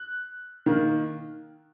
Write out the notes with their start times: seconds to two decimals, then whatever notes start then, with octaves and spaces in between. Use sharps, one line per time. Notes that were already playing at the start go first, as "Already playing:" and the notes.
Already playing: F#6
0.66 D#3 A#3